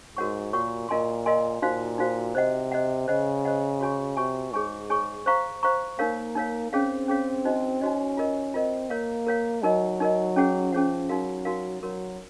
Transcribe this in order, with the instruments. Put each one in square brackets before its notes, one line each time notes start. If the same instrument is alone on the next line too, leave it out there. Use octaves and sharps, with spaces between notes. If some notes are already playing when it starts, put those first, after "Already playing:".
[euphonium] G#2 [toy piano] F#4 A#4 C#5 F#5 C#6
[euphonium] A#2 [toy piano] F#4 A#4 C#5 F#5 C#6
[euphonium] A#2 [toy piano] F4 A#4 D#5 G#5 C6
[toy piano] F4 A#4 D#5 G#5 C6
[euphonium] A#2 [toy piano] D#4 F#4 C5 F5
[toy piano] D#4 F#4 C5 F5
[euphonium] C3 [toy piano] C5 D#5 F#5
[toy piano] C5 D#5 F#5
[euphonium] C#3 [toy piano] C5 D#5 F#5
[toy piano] C5 D#5 F#5
F#4 C#5 G#5 C#6
[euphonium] C3 [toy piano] F#4 C#5 G#5 C#6
[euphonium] G#2 [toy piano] G#4 C#5 G#5 C#6
[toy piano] G#4 C#5 G#5 C#6
C5 F5 A#5 C#6
C5 F5 A#5 C#6
[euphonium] A#3 [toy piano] D#4 A#4 C#5 F5
[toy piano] D#4 A#4 C#5 F5
[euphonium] C4 [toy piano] C#4 G#4 C#5 F5
[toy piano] C#4 G#4 C#5 F5
D#4 F#4 C5 D#5
[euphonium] C#4 [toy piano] D#4 F#4 C5 D#5
[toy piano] F4 A#4 D#5
[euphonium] C4 [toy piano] F4 A#4 D#5
[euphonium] A#3 [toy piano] A#4 C#5 F5
[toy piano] A#4 C#5 F5
[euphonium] F#3 [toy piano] D#4 A#4 D#5
[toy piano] D#4 A#4 D#5
C#4 G#4 C#5 F#5
[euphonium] F3 [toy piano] C#4 G#4 C#5 F#5
[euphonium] F#3 [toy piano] D#4 F#4 A#4 F5
[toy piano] D#4 F#4 A#4 F5
[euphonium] F#3 [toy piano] F#4 A#4 C#5